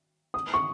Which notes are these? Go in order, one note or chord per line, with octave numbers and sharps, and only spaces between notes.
D#6
C#6